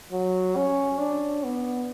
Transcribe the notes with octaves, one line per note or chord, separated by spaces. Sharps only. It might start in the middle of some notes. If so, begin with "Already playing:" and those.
F#3
C#4
D4
B3